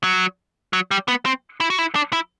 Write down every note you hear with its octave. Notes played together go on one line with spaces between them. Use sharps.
F#3
F#3
G3
B3
C4
E4
F#4
E4
D4
E4